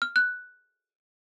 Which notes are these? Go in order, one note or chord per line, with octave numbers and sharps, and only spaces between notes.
F6
F#6